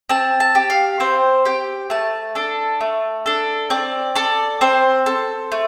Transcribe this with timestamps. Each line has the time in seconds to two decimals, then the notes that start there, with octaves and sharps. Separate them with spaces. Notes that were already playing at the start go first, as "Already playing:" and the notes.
0.09 C4 A5
0.40 A5
0.55 G4
0.70 F5
1.00 C4 C5
1.45 G4 G5
1.90 A3 A5
2.35 D4 A4
2.81 A3
3.26 D4 A4
3.70 C4 D5
4.15 A4 D5
4.61 C4 C5
5.06 A4
5.52 A3